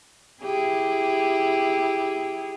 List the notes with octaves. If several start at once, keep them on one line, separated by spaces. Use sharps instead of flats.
E4 G4 G#4